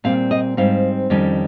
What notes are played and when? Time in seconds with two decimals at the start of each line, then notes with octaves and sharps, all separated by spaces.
0.04 A#2 G3 C4 F5
0.31 D#5
0.57 G#2 G3 C4 D#4 F5
1.10 F2 D#3 G3 C#4